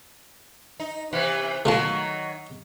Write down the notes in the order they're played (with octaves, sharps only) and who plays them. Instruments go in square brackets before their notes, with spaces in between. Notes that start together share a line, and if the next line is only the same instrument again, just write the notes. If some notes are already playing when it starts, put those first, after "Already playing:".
[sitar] D#4
C3 E3 B3
[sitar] D#3 F#3 [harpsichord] A3 F4 A5